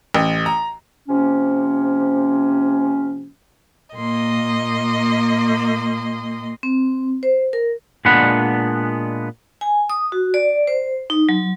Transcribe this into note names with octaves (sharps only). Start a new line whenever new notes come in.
A1
A#5
C3 F3 A#3 C#4
A#2 A#3 D#5 C6
C4
C5
A#4
A#2 G#3 B3 D4 F#5 B5
G#5
D#6
F#4
D5
C5
D#4
F#3